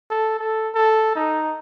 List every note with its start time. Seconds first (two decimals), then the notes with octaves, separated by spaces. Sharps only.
0.10 A4
0.39 A4
0.74 A4
1.15 D#4